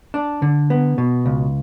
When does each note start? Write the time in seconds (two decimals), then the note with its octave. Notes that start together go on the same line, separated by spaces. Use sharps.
0.14 D4
0.42 D3
0.70 B3
0.98 B2
1.26 C#2